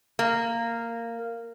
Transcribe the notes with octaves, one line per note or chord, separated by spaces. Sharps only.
A#3